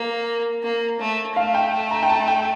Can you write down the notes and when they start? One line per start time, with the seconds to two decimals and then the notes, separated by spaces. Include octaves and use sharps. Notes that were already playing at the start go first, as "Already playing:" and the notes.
Already playing: A#3
0.63 A#3
1.00 A3
1.36 A3 F5
1.55 G5
1.91 A#5
2.03 G5
2.09 A5
2.28 G5